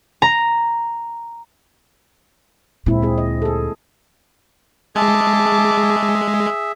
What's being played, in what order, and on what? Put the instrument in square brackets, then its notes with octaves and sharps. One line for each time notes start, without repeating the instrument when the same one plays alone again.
[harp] A#5
[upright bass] D2 A#2 [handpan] G#3 C4 E4
[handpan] C4 G#4
D#5
G#4 A4
[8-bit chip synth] G#3 [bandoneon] G#4 E5 [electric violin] A5 D6